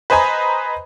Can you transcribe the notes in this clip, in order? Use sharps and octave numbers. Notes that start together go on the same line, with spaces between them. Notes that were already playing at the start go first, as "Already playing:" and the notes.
B4 C5 D#5 G#5 A#5 B5